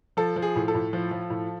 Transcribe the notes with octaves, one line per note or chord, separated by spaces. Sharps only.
F3 A4
F3
G#4
A2
A4
A2
F3
F3
A2